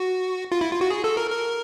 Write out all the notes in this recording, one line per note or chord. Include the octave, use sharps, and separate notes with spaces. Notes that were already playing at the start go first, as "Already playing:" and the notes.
Already playing: F#4
F4
E4
F4
F#4
G#4
A4
A#4
A#4